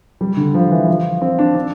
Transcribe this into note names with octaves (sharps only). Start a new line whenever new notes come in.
G3
D3
F3
E3
F3
C4
D4
D4